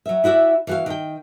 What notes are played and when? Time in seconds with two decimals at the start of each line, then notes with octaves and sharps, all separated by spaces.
0.06 F#3 E5
0.24 E4 F#4 D5 E5
0.67 E3 F#4 F5
0.86 D#3 G5